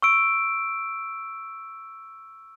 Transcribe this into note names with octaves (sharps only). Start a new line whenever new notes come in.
C#6 E6 D7